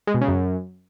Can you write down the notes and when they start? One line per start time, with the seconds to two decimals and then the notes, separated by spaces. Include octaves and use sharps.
0.07 G#3
0.14 B2
0.21 C#3
0.28 F#2